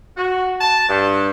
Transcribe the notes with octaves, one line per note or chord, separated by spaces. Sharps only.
F#4
A5
G2